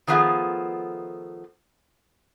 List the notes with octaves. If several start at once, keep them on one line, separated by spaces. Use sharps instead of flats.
D#3 F3 A3 B3 F4 G#4